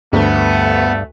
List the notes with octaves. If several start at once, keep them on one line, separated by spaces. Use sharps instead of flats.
D2 G2 A3 B3